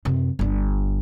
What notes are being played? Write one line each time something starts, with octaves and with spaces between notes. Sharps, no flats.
F#2 C3
G1 D4